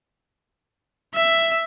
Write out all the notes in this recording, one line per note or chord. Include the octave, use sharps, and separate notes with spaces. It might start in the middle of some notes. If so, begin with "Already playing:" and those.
E5